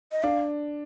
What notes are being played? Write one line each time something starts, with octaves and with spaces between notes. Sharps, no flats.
D#5
D4 F5